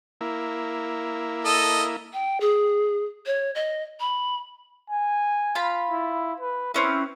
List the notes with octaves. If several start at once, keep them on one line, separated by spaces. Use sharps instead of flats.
A#3 E4
A4 D#5
G5
G#4
C#5
D#5
B5
G#5
F4 F5 B5
E4
B4
C4 C#4 E4 B4